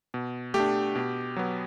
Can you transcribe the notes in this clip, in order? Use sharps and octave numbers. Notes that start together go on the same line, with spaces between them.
B2
A3 G4
D4
B2
F#3 B3